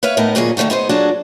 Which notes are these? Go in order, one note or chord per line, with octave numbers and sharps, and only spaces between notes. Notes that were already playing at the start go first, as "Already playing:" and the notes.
B4 C#5 E5 F5
A2 B3 D#4 A#4
D#2 A#2 F#3 C#4 G#4
D3 D#3 F#3 A3 F#4
B3 D#4 G#4 C5
A#2 F#3 D4 F#4 G#4 A4